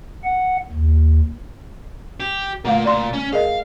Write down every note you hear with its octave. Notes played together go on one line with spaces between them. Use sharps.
F#5
D#2
G4
A#2 D3 A3 A#3 F5
A#2 D5 C6
C#4
G#4 A#4 D#5 F5